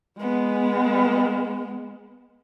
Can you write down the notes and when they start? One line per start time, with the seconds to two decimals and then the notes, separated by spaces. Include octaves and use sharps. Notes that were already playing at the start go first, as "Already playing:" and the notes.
0.19 G#3 B3